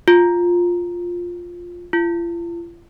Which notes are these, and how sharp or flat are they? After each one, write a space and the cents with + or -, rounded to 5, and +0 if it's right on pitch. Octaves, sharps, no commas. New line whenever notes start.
F4 +5
F4 -40